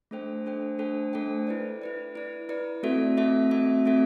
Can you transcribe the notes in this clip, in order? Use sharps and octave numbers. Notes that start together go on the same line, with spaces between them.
A3 D4 A4 C5 G5
A3 D4 A4 C5 G5
A3 D4 A4 C5 G5
A3 D4 A4 C5 G5
E4 B4 D5
E4 B4 D5
E4 B4 D5
E4 B4 D5
A3 C4 F#4 A4 E5
A3 C4 F#4 A4 E5
A3 C4 F#4 A4 E5
A3 C4 F#4 A4 E5